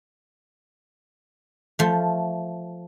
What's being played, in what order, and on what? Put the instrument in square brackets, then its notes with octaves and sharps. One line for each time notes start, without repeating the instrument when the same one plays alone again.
[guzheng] F3 A3